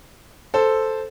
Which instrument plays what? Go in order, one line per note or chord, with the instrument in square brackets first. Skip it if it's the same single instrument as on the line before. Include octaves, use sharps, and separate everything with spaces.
[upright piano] A4 C5